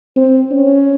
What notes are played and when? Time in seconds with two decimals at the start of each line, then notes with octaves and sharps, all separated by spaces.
0.16 C4
0.51 C#4